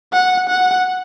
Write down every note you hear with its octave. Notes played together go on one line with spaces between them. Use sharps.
F#5
F#5